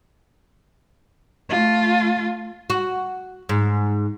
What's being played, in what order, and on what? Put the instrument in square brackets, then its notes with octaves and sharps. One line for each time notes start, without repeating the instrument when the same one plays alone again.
[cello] A3 F4
[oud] F#4
G#2